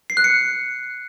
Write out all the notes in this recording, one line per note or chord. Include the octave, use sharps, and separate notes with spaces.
C7
F#6
C#7